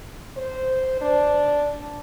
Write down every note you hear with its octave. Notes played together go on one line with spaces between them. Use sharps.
C5
D4